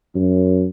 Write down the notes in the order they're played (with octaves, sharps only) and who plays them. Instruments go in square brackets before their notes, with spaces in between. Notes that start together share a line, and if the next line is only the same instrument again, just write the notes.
[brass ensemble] F#2